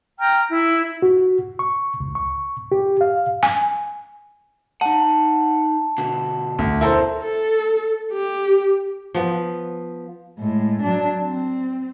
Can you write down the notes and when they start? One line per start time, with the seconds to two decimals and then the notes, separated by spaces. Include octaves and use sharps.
0.19 G5 A#5 F6
0.49 E4
1.02 F#4
1.59 C#6
2.00 C#2
2.15 C#6
2.72 G4
3.01 F5
3.43 G#5
4.81 D#4 F#5 A5
5.98 B2 D3 F#4
6.59 D2
6.81 B2 E4 A4 A#4 C5
7.22 A4
8.13 G4
9.14 F3 B3
10.39 A2 G#3
10.82 F#3 D4
11.22 C4